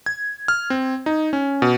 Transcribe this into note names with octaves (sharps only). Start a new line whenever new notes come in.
G#6
F6
C4
D#4
C#4
B2